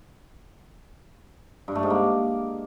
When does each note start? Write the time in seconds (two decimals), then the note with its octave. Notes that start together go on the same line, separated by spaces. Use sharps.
1.68 G2
1.75 A3
1.83 G#2
1.90 A#3